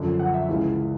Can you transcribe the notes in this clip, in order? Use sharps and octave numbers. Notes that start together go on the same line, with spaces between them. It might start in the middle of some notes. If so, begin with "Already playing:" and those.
Already playing: F#2 D3 F3
F#5
E5
C#2 C#3 E3